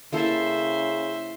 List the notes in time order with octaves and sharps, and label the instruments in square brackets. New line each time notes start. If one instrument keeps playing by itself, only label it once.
[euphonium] C#3 [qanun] A#3 E4 A4 [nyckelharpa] C5 E5